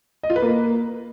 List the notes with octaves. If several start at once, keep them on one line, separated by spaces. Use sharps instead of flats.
D#5
F4
B4
A#3